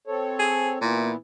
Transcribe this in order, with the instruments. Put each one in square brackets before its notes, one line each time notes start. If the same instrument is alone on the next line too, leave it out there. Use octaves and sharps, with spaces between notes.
[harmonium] C4 A4 C#5
[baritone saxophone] G#4
[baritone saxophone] A#2 [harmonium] E3 B3 E4